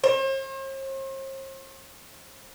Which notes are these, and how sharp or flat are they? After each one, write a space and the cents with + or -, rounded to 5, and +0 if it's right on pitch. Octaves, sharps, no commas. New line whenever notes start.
C5 +45